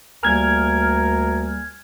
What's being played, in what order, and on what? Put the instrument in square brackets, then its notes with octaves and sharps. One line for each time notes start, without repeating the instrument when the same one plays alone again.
[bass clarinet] D2 [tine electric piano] G3 A#3 G#5 [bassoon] A#4 [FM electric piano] F6 G#6